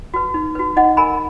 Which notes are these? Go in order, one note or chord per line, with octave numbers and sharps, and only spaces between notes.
F#4 B4
D#4
F#4 B4
D#4 D#5 F#5
A#4 G#5 B5